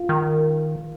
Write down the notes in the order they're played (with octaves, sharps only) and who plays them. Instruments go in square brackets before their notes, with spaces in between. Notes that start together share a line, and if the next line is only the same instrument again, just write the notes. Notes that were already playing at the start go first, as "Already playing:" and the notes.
Already playing: [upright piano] F4
[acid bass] D#3